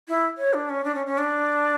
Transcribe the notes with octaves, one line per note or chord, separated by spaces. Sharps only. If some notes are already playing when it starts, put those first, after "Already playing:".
E4
C#5
D4
C#4
D4
C#4
C#4
D4